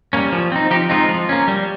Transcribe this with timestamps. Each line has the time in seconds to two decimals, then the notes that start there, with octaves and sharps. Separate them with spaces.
0.13 G3 A#3 C#4
0.32 F3
0.52 C4 D#4
0.71 F3 D#4 G4
0.90 G#3 C4 D#4 F4
1.09 F3
1.29 A#3 C#4
1.48 G3